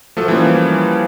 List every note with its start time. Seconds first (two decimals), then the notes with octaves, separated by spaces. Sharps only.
0.17 F3 A3 F#4 A4
0.28 E3 F3 G3 A#3 C#4